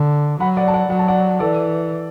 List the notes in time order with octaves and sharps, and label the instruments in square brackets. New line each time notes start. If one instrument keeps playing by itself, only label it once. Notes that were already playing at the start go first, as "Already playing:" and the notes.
Already playing: [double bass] D3
[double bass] F#3 [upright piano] F#5 B5
[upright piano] D5 F#5
A5
D5 F#5
[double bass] F#3 [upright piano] F#5
[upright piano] A5
D5 F#5
[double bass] E3 [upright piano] A4 D5